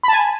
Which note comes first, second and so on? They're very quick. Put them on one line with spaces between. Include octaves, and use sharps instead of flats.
B5 A5 G#5